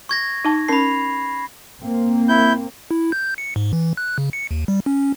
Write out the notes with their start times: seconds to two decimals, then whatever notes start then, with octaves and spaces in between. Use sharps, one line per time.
0.09 C#6 G#6 A#6
0.45 D#4 A5
0.68 C#4 A#4 A5 B5 C7
1.81 A#3 C4
2.29 E4 G6
2.91 E4
3.12 G6
3.38 C#7
3.56 G#2
3.73 E3
3.97 F#6
4.18 C#3
4.33 C#7
4.51 D#2
4.68 G3
4.86 C#4